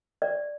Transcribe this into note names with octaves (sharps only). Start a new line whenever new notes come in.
D5